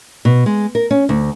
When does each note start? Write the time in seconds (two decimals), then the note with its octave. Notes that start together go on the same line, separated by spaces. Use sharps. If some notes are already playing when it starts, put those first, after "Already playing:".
0.25 B2
0.46 G#3
0.75 A#4
0.91 C#4
1.09 D2